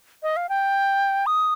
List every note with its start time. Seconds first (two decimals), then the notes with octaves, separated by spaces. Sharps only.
0.23 D#5
0.37 F5
0.49 G5
1.26 D#6